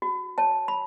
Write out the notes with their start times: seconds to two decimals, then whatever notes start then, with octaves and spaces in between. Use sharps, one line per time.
0.02 F#4
0.38 C#5 A5
0.68 B5